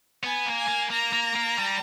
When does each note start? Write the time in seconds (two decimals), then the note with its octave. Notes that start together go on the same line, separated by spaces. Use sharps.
0.23 B3 G#5
0.46 A#3
0.57 G#5
0.68 A#3
0.90 A#3 A#5
1.13 A#3
1.36 A#3
1.58 G3